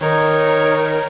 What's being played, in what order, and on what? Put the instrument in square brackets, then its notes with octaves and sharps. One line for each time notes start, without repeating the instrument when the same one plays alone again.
[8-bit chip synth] D#3 A#4 [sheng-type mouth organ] D#4 C#5